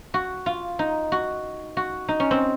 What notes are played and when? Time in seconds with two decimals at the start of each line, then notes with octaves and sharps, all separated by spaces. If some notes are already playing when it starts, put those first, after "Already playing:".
0.14 F#4
0.46 F4
0.79 D#4
1.12 F#4
1.77 F#4
2.08 D#4
2.20 C#4
2.31 C4